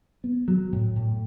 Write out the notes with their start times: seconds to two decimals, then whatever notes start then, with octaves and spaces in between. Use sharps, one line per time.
0.24 B3
0.48 F#3
0.72 A2
0.96 A2